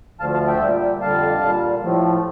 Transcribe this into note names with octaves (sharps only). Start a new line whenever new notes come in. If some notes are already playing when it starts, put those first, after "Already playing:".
D2 D3 F3 A3 F5 A5
F5 A5
E5 G5
A#2 G3
F2 D3 G3 F5 A5
A#2 G3
A2 F3 A3